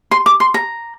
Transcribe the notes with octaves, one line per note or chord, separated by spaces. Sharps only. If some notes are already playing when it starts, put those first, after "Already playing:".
C6
D6
C6
A#5